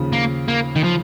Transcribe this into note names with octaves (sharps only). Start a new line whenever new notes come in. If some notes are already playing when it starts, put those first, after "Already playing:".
Already playing: D#2 C#3 F3
A#3
A#3
D#3
F3